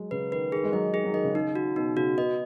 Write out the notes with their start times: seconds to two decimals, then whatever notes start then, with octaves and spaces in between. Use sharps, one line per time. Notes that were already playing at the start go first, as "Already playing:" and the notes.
Already playing: F#3 G#3
0.11 C#3 B4
0.32 D#3 B4
0.52 D#3 G#4
0.64 G#3
0.72 F#3 D#5
0.94 D#3 G#4
1.05 F#3
1.14 D#3 D#5
1.24 C#3
1.35 D#4
1.55 F#4
1.76 B2 D#4
1.97 C#3 F#4
2.17 B3 D#5